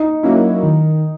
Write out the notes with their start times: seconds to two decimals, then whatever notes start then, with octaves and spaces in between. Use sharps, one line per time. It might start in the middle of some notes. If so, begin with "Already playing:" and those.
Already playing: D#4
0.23 F#3 A#3 C#4 E4
0.63 D#3